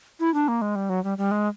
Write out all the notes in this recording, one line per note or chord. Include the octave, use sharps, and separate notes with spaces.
E4
D4
A#3
G#3
G3
F#3
G3
G3
G#3